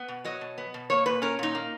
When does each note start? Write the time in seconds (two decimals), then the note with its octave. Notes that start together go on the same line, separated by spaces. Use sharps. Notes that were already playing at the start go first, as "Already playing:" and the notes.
Already playing: B3
0.08 B2
0.25 F#3 D#5
0.41 B2
0.58 B3
0.74 B2
0.90 A#3 C#5
1.06 A#2 B4
1.22 C#4 A#4
1.39 A#2 D#4
1.55 A#3